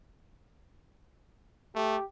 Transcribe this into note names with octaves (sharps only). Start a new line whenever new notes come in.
A3 G4